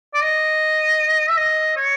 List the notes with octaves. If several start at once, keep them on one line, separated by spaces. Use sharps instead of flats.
D5
D#5
E5
D#5
C#5